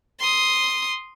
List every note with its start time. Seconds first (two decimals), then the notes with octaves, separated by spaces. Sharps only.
0.20 C6 D#6